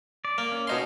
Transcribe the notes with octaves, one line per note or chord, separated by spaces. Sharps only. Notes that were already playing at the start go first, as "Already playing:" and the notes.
D5
A#3
C#4
B2 D#4 C6